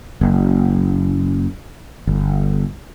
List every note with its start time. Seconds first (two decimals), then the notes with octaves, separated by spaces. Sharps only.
0.21 F#1
2.07 G1